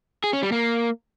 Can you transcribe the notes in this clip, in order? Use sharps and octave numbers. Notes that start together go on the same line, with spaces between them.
G#4
C#4
G3
A#3